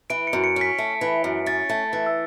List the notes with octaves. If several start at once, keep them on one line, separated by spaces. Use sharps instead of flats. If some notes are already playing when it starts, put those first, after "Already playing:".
E3 D7
C#7
F#2
C#7
C#4
B6
A3
E3
F#2
C#4 A6
A3
E3
E6